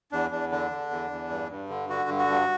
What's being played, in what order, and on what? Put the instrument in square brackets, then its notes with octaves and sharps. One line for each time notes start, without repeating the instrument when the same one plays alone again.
[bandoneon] E2 D4
E2 D4
D3 D4
D3
E2
E2
G2
G2
D3
D3 F#4
G2
F#4
G2